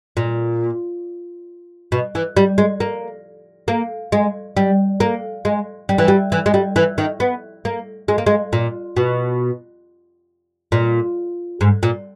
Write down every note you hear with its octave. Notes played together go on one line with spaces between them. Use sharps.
A#2
B2
E3
G3
G#3
A#3
A#3
G#3
G3
A#3
G#3
G3
E3
G3
E3
G#3
G3
E3
D#3
B3
A#3
G#3
A#3
G#3
A#2
B2
A#2
G#2
A#2